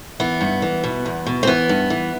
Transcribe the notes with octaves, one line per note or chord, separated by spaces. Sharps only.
E3 B3
G2
E3
B2
E2
B2
C4
E3 B3
G2
E3